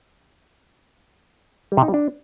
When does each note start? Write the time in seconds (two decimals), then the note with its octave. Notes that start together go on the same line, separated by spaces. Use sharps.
1.72 G3
1.77 C3
1.83 D#4
1.88 G3
1.94 D4